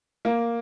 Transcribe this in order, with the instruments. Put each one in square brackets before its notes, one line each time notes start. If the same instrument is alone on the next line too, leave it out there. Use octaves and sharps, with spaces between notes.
[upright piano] A#3